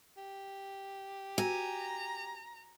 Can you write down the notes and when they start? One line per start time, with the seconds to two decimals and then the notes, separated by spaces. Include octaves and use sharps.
0.17 G4
1.38 F#4 G#5 A#5